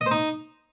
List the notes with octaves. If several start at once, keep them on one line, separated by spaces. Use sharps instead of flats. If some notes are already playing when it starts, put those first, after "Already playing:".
D#5
C5
D#4